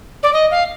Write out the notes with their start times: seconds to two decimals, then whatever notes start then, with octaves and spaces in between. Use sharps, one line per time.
0.23 D5
0.33 D#5
0.51 F5